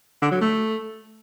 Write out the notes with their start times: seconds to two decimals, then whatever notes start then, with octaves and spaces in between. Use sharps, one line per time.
0.22 D3
0.31 F#3
0.41 A3